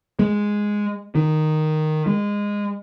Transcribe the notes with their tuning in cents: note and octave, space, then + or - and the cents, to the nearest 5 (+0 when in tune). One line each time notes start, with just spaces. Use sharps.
G#3 -5
D#3 -5
G#3 -20